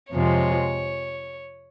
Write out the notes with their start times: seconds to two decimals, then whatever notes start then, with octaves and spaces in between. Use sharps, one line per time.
0.12 F2 C3 F3 G#3 C#5